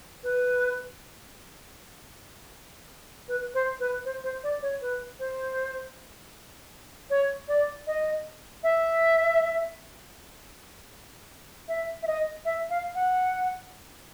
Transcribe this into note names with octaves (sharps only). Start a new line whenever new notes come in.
B4
B4
C5
B4
C5
C5
D5
C#5
B4
C5
C#5
D5
D#5
E5
E5
E5
D#5
E5
F5
F#5